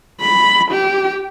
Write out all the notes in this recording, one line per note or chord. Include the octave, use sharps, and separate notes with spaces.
B5
G4